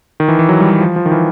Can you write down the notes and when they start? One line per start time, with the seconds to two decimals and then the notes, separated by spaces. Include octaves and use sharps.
0.20 D#3
0.28 E3
0.39 E3
0.49 F#3
0.60 G3
0.71 F#3
0.80 F3
0.96 F3
1.06 D#3
1.12 E3